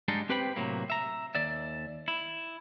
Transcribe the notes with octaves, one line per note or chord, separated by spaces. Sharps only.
G#2 G3 G#3 D4 D#4
C4 G4 B4 C5 G5 B5
A2 C3 F#3 A#3
E5 A#5
D#2 D5 E5
E4